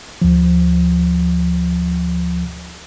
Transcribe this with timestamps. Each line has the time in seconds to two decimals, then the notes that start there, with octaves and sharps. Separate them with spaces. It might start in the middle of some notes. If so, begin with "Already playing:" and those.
0.22 D2 F3